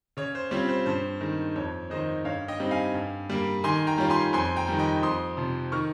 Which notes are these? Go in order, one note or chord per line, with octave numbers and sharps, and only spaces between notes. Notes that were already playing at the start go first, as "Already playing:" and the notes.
C#3 C#5
C5
G3 C4 F4 C#5
C5
G2 C5
D#3 G#3
F2 C#5
D#3 G#3 C5 D#5
G2 C#5 F5
D#5 G5
G3 C4 D#4
F5 G#5
G2
G3 A#3
D#3 G#5 C6
G5 A#5
G3 C#4 F4
G#5 C6
F2 G#5 C6
G5 A#5
D#3 G3
D#5 G5
F2 C6 D#6
C3 F3
D#3 C#6 F6